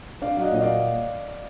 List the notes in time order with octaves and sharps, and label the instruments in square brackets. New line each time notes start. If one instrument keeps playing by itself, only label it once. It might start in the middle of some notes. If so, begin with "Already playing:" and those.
[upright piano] D4 [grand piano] D5 F5
[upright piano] F#3 [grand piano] F5
[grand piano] D#5 F#5
[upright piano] A#2 [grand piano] D#5
[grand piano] D5 F5